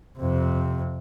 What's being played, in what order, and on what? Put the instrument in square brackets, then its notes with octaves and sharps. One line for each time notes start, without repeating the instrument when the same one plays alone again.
[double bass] F2 C3